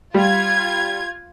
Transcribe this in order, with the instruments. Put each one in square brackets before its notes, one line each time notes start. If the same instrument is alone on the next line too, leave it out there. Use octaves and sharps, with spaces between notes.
[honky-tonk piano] G3 [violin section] F4 G#6